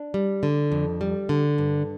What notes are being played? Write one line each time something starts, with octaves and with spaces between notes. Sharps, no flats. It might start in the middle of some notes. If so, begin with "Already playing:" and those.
Already playing: D4
G3
D3
F2
G3
D3
G2